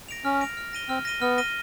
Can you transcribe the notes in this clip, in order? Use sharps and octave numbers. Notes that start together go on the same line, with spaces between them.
A#6 D7 F7
C#4 F6
A#6 D7 F7
F6
A#6 D#7 G7
C4 F6
A#6 D#7 G7
B3 F6
A#6 D#7 G7